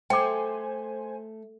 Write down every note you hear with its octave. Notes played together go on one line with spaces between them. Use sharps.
A3 C5 G5 G#5 D6